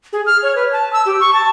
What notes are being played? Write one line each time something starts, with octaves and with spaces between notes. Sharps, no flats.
G#4
F6
C#5
B4
A5
E6
G4
C#6
A5